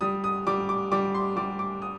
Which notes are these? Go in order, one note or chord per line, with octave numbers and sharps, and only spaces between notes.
G3 D#6
D#6
G3 D6
D6
G3 D6
C6
G3 D6
D6
D#6